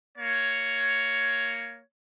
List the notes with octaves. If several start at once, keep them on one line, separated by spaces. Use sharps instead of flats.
A#3 C#5